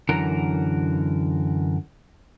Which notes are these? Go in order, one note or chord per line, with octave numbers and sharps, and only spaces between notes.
F#2 D3 E3 F#4 A#4 A#5